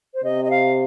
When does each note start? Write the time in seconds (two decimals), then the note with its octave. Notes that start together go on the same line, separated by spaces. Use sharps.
0.14 C5
0.24 C3 D#5
0.45 D#5
0.50 F5